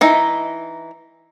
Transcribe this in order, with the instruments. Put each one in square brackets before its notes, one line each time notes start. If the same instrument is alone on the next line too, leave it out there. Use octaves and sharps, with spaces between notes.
[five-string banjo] E3 D#4 E5